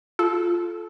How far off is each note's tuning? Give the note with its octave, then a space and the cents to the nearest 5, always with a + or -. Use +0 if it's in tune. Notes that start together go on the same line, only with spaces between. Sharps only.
F4 +0 A4 -20